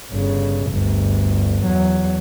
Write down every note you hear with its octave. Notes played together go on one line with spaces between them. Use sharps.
G1 C#3
G1 D2
E2 F#3